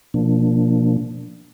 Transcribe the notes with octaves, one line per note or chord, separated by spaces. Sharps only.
B2 F3 A#3 D4